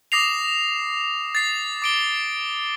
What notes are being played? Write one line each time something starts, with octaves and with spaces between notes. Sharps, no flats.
D6 D#6 A#6 C7 F7
A6 C7
D6 D7 G7